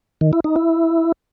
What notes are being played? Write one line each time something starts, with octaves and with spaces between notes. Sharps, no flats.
D#3
E4
D#4
E4